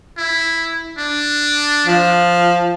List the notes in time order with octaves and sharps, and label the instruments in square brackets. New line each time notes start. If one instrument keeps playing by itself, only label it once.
[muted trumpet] E4
D4
[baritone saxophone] F3